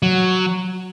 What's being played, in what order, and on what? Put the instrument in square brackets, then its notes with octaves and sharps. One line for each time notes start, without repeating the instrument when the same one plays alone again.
[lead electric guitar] F#3